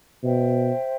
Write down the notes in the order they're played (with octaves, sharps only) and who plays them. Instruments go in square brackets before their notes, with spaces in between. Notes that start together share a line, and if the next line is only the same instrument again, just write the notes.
[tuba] B2 [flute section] C5 E5 G5